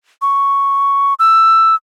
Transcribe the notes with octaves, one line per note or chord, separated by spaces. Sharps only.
C#6
E6